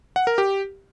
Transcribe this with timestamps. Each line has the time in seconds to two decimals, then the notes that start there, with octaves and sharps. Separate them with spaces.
0.16 F#5
0.27 A#4
0.38 G4